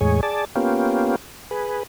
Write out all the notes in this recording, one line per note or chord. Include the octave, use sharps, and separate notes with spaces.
E2 A2 G#3 G#4 C#5
G#4 D5 A5
A#3 B3 C#4 F4 G4
G#4 B4